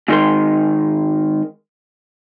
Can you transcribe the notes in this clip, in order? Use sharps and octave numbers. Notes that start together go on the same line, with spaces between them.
G#2 D#3 G#3 A#4 C6